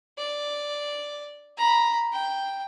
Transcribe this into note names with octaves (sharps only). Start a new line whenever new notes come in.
D5
A#5 B5
G5